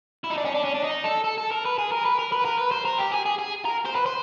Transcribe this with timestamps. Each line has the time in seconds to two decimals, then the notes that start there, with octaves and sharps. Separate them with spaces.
0.24 E4
0.30 D#4
0.38 D4
0.45 C#4
0.55 D4
0.65 C#4
0.75 D4
0.84 D#4
1.05 A4
1.24 A4
1.38 A4
1.52 A#4
1.65 B4
1.78 G#4
1.92 A#4
2.05 B4
2.19 A#4
2.32 B4
2.45 A#4
2.59 B4
2.72 C5
2.85 A#4
2.99 G4
3.12 G#4
3.26 G#4
3.39 G#4
3.65 A#4
3.86 C5
3.95 B4
4.06 C5